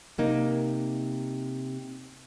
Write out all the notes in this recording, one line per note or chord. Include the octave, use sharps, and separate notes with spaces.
C3 A#3 D#4